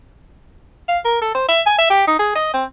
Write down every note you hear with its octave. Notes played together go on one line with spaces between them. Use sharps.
F5
A#4
A4
C5
E5
G#5
E5
G4
D#4
G#4
D#5
C4